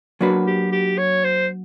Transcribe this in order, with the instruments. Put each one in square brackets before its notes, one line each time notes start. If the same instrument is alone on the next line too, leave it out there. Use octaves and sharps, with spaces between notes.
[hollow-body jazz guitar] F#3 A#3 D4 F#4 B4
[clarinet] G4
G4
C#5
C5